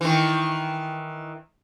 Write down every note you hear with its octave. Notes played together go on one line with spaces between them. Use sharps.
D#3 E3